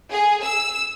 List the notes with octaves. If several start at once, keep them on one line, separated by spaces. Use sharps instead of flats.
G#4
E6